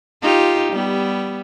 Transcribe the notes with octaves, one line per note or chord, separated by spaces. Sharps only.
D#4 F4 G4
G3 B3